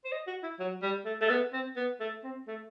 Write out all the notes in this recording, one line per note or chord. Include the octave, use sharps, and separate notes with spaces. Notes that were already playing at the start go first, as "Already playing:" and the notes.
C5
D#5
F#4
E4
F#3
G3
A3
A3
B3
C4
B3
A3
C4
A3